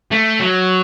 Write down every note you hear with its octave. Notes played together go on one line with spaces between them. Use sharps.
A3
F#3